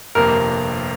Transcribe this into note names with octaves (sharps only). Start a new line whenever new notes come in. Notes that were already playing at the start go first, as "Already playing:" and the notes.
G1 F2 C3 A#3 A#4